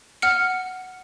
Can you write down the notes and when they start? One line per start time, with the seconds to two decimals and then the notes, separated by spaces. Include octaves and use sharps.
0.22 F#5 F6 C#7